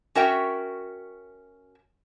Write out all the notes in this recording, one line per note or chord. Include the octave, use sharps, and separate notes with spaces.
C#4 F#4 A#4 E5 G5